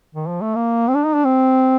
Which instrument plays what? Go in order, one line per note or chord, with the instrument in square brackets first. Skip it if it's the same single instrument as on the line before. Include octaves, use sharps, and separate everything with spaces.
[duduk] D#3
F3
A3
A#3
C4
D4
D#4
D4
C4